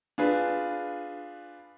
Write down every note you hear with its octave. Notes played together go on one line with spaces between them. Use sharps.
D4 F4 G#4 B4